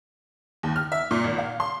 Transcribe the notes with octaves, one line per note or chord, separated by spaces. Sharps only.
D#2
F6
E5
A#2
G#1
F5
C6